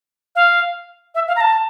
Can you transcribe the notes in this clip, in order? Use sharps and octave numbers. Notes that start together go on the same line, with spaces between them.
F5
E5
F5
A#5
A5